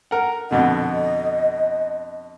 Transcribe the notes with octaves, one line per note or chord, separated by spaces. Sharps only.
A#4 F#5
F2 B2 D3 D#5